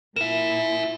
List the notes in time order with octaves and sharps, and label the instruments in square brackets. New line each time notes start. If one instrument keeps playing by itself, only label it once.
[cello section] A#2 E4 [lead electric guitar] A#4 E5 [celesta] E7